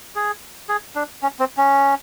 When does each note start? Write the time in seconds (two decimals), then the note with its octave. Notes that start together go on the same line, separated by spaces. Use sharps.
0.15 G#4
0.69 G#4
0.95 D4
1.22 C#4
1.39 C4
1.57 C#4